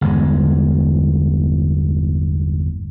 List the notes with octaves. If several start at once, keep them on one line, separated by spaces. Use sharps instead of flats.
G1 E2 G#3